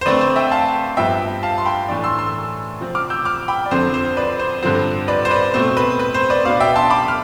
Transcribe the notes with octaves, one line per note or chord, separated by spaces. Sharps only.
C5
D3 A3 C4 B4 D5
C5
E5 G5
F5 A5
G2 F3 B3 E5 G5
F5 A5
C6
G5 B5
A2 E3 A3 D4
C6 E6
C6 E6
C3 F3 C4
D6 F6
E6 G6
D6 F6
G5 B5
D5
F2 D3 F3 C4 C5
C5
B4 D5
C5
G2 D3 F3 C4 C5
B4 D5
C5
B4 D5
B2 A3 C4 C5
B4
B4
C5
B4 D5
B2 B3 D4 D5 F5
E5 G5
A5 C6
B5 D6
F6